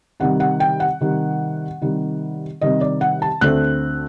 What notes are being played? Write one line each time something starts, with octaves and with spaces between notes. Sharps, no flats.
C3 D#3 G3 F#5
F#5
G5
F#5
C3 D#3 G3
C3 D#3 G3
C3 D#3 G3 D#5
D5
F#5
A5
D2 D3 A3 C4 F#6